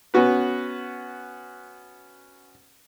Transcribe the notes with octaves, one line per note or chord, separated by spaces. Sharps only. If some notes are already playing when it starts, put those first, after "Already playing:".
B3 C#4 F#4 B4